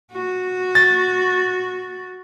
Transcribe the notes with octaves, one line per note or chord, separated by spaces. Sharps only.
F#4
A6